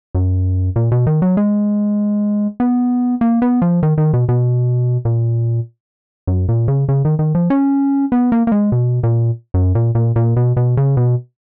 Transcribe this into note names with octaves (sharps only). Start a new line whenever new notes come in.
F#2
A#2
B2
D#3
F#3
G#3
B3
A#3
B3
F3
D#3
D#3
B2
B2
A#2
F#2
A#2
C#3
C#3
D#3
D#3
F3
C#4
B3
A#3
A#3
G#3
B2
A#2
F#2
A#2
A#2
A#2
B2
B2
C#3
B2